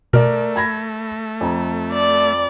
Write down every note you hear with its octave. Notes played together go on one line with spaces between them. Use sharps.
B2 A3 A#4 D5
B5 G#6 A#6
F2 A#5
D5